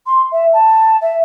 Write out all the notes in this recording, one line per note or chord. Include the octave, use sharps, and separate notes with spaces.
C6
E5
A5
E5